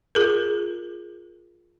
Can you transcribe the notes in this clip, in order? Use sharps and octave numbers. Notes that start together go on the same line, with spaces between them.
F4 G#4 A#4